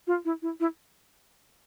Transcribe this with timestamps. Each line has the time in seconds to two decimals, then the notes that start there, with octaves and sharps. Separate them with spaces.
0.07 F4
0.25 E4
0.42 E4
0.60 E4